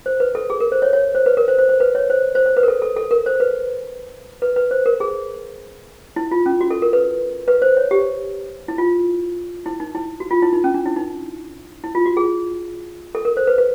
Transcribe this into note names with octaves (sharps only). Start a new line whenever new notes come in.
C5
B4
A4
G#4
A#4
C5
C#5
C#5
C5
B4
A#4
C5
C5
C5
B4
C#5
C5
C5
C5
B4
A#4
A4
A4
A4
A#4
C5
B4
B4
B4
C5
A#4
G#4
E4
F4
C#4
F#4
A4
A#4
B4
B4
C5
C#5
G4
E4
F4
E4
D#4
E4
F#4
F4
E4
D#4
C#4
D4
E4
D#4
E4
F4
F#4
G#4
A4
A#4
C5
B4
B4